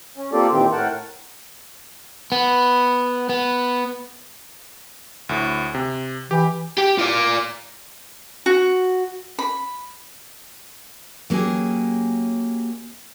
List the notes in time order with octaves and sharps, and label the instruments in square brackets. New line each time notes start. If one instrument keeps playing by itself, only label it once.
[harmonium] C#4
A#3 C4 F4 G4 A4 D5
A#2 D#3 E3 C4 G4
A2 A3 A#4 F#5 G5 A5
[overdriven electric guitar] B3
B3
[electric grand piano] D2 A2
C3
[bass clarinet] E3 [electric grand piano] G4
[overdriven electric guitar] G4
F4 D5
[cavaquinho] F#4
B5
[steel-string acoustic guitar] F#3 A#3 C#4 G4 G#4